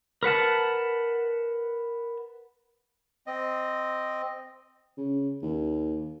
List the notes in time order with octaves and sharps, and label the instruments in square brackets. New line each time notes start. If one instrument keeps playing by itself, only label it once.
[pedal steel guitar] A#4 B4 F#5 A5
[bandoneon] C4 D#5
[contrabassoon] C#3
D#2